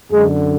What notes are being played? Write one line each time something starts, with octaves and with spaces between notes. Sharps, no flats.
F#2 D3 G#3